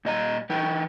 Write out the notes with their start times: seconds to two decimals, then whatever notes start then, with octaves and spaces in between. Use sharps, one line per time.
0.05 A#2 D#5 A#5
0.49 E3 D#4 E4 B4 G5